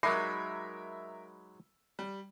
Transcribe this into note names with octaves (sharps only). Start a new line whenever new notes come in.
F#3 G#3 D#4 A#4 E5 B5 D6 C7
G3